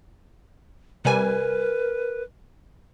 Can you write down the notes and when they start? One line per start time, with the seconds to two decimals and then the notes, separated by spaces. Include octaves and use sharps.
1.05 C3 G3 A#4 B4 G#5